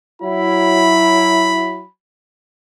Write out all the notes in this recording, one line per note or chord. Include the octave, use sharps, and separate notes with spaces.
F#3 E4 B5